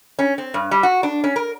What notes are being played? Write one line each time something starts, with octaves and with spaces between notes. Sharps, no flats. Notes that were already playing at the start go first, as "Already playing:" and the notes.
C#4
C4
G2
G3
F#4
D4
C#4
A#4